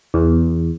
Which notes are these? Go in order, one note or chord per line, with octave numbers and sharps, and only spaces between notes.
E2